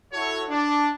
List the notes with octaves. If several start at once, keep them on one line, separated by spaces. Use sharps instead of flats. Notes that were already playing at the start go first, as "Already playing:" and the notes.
E4 F#4 A4 C#5
D4